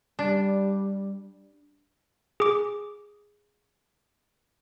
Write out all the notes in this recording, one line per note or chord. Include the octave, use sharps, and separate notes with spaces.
G3 D4
G#4 D6